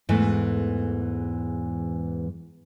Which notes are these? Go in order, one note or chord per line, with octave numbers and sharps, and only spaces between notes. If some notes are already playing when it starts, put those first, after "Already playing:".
E2 G#2 E3 A3